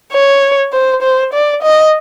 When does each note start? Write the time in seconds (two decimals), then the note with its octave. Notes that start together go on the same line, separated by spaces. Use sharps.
0.13 C#5
0.73 C5
1.02 C5
1.33 D5
1.63 D#5